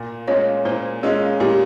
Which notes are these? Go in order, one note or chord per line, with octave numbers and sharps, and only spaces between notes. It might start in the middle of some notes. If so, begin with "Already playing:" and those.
Already playing: A#2
G#3 C#4 F4 C#5
A#2 C5
G#3 C#4 F4 G#4
A#2 G4